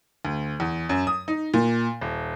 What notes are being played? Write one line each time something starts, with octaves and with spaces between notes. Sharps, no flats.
D2
E2
F#2
D#6
D#4
A#2
D#1